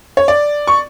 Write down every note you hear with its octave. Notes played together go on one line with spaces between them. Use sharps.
C#5
D5
C#6